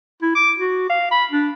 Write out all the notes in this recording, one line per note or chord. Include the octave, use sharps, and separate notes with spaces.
E4
D6
F#4
F5
B5
D4